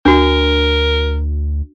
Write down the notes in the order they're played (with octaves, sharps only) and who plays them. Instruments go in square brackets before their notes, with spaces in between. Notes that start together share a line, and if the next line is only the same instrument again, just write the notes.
[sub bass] D2 [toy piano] D4 F#4 [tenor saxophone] A#4